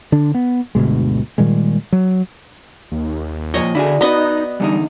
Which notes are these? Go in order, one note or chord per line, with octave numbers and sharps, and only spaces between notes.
D3 D4
B3
G1 D2 B2 G#3
A#2 D#3 G3 G#3
F#3
D#2
A#2 D#3 F3 C#5 D#5
D3 E4 F#4 G#4 D5
B3 D#4 F#4 D#5
E2 D3 G3 D#4